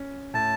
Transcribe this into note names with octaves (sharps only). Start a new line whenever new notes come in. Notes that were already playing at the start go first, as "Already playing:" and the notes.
Already playing: C#4
A2 A5